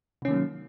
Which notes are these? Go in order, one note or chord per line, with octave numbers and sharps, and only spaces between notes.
C3 D#3 F#3 A#3 C#4